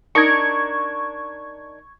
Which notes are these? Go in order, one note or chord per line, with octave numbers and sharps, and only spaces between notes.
D4 D#4 A#4 C#6 G#6